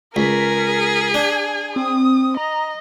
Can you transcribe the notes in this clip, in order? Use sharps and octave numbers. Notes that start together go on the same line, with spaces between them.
C#2 G#4 A#4 B6
D4 G#5
C4 D#6
D#5 A#5